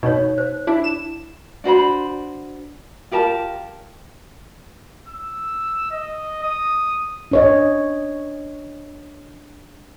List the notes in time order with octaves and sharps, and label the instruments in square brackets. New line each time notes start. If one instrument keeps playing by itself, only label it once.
[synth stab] B2 [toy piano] D#4 C#5
[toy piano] C5
[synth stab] D4 E4
E7
[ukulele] D4 F#4 C5 B5
F4 G4 A#4 A5
[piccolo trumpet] E6
D#5
D#6
[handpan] D4 C#5 D#5